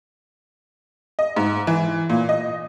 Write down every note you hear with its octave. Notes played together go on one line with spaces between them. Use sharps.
D#5
G#2
E3
A#2
D#5